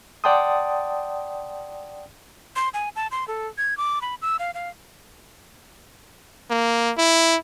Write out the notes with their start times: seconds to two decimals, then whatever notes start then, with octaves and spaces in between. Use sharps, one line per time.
0.24 D5 F#5 G5 A5 C6 D#6
2.56 C6
2.74 G#5
2.96 A5
3.11 C6
3.28 A4
3.58 G#6
3.77 D6
4.02 B5
4.22 E6
4.39 F5
4.55 F5
6.50 A#3
6.97 E4